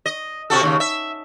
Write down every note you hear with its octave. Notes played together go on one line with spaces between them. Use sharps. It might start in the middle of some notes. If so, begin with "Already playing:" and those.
D#5
C3 F#4 A4
D#2 C#3
E5